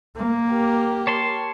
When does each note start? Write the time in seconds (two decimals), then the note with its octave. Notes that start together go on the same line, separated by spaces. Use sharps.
0.17 A#3
0.50 G4 A#4
1.07 C#5 A5 C6